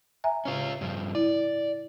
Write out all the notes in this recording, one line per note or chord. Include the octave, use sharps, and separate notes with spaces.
E5 G#5 A#5
A2 C#3 C#4 F4
G2 F3
E4 D5